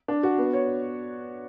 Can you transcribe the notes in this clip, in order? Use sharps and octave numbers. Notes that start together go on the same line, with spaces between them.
D4
F#4
B3
C#5